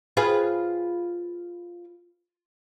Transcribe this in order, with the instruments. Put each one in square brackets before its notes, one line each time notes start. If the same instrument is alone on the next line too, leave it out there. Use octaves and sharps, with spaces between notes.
[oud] F4 G#4 B4